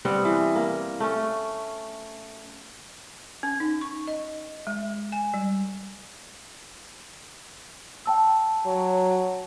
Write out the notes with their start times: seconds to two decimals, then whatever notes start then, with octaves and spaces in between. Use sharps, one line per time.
0.05 G3 B3 C4 F#5
0.25 E3
0.55 A#3
1.00 A3 C#4
3.43 C#4
3.60 D#4
3.81 C#6
4.07 D#5
4.67 G#3
5.12 G#5
5.34 G3
8.06 G5 A5 E6
8.66 F#3